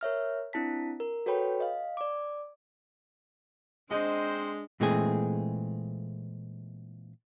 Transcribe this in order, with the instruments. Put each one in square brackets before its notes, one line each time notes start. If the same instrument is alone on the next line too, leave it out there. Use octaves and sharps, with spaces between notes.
[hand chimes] A#4 C#5 E5 F6
C4 D4 E4 A5 B6
A#4
F#4 A4 B4 C#5 G5 B5
D#5 F5
D5 D6
[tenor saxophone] G#3 [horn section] C4 C5 [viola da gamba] D4 [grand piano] D#5
[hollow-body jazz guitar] A#2 E3 G#3 A3 C4 G#4